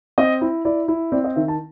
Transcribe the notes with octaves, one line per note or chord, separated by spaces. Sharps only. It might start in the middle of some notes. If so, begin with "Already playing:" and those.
C4 D#5
E4
E4 D5
E4
C4 D5
D#5
D#3 E5
A5